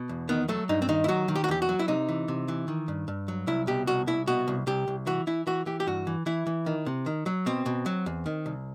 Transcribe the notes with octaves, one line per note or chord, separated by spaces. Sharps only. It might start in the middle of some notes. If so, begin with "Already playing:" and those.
Already playing: B2
E2
D#3 B3
F#3 A3
G2 D#4
C4
D#3 D#4
E4
F#3 F#4
D#3
G4
F#4
E2 G4
F#4
F#3
E4
C3 D#4
E3
C3
E3
D#3
G2
G2
F#3
C2 E4
B2 G4
C2 F#4
C2 E4
B2 F#4
C2
C2 G4
C2
E3 F#4
E3 E4
E3 F#4
E3 G4
G4
G2 F#4
E3
E3 E4
E3
D#3
C3
D#3
F#3
B2 C4
B2
F#3
E2
D#3
C2